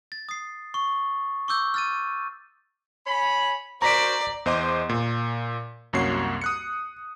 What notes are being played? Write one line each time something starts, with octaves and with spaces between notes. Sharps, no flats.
A6
D#6 C7
C#6
C#6 D6 E6 G6
F6 A6 D#7
C#5 G#5 B5
F#4 A#4 C5 D5 A#5 A#6 B6 D7
E2 C5 D#5 C6 D6
A#2
C2 F#2 A#3 F#4 C#5 C7
D#6 F#6 C#7